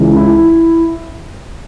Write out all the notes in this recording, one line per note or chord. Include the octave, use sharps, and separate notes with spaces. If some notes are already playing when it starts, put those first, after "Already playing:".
Already playing: C#2 C#3 E3
E4